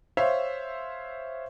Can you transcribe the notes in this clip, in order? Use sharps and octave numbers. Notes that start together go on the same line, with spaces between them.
C5 C#5 E5 F5